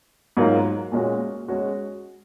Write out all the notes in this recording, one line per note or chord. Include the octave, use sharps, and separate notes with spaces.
G#2 F#3 A#3 F4
A#2 G#3 C#4 F#4
G#3 C#4 F#4